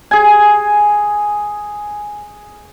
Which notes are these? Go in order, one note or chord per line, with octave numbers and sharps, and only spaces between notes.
G#4 G#5